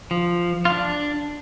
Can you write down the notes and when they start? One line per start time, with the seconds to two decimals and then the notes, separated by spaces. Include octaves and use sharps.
0.11 F3
0.65 F4
0.70 D4